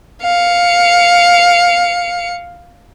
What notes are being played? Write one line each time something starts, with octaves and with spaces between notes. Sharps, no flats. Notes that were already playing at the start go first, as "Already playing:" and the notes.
F5 C#7